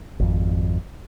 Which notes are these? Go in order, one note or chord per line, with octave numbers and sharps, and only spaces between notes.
G#1 F2